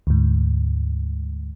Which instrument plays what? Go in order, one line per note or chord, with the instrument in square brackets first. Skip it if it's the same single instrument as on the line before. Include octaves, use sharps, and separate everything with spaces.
[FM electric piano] D2 G#2